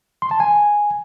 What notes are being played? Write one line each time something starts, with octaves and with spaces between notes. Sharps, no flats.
C6
A5
G#5